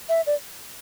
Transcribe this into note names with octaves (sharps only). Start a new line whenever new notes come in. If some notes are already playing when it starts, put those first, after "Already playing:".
E5
D5